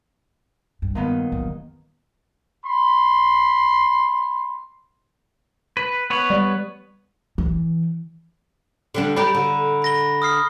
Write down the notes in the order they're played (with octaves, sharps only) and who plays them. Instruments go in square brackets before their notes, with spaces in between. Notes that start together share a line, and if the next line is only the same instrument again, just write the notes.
[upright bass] G2
[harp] A#2 D#3 B3
[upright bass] G2 F#3
[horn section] B5 C6
[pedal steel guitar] B4
B3 B4 C#5
[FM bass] G3
[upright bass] E3
[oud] D3 G3 D4
[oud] G4 A4 D5 [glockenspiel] A#5 B5
[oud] D3
[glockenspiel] B5 A#6 G7
D#6 F6 C7